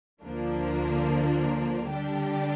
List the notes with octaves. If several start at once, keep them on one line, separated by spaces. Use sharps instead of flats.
D2 D3 F3 A#3 D4
D3 G3 D4 G4